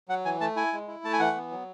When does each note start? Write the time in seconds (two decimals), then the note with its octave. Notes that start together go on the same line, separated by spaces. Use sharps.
0.09 F#3 F#5
0.25 E3 G#5
0.41 A3 A5
0.56 E4 G#5
0.73 G#3
0.88 E4
1.04 A3 A5
1.13 G#5
1.20 E3 F#5
1.36 B3
1.51 F#3